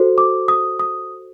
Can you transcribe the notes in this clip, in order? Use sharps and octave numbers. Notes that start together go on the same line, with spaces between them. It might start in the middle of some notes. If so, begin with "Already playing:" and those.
Already playing: F#4 A4 C5
D6
D#6
D#6